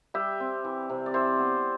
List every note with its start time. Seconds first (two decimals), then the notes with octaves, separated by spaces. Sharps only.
0.14 G3 E5 G5
0.40 C4
0.64 E3
0.90 C3
1.06 D5
1.14 E3 C5 E5
1.39 B3